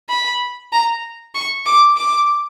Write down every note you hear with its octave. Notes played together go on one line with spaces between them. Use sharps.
B5
A#5
C#6
D6
D6